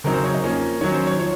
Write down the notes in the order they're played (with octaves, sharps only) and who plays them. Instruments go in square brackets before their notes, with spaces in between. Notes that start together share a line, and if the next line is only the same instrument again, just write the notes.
[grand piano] C#3 F#3 C4 D#4 A#4
C5
C#5
D#5
F3 A#3 C#4
D#3 F#3 C#4 C#5
C5
C#5
F3 C#5